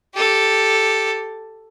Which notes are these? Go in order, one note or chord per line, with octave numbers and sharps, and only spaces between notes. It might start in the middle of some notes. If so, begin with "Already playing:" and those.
G4 A4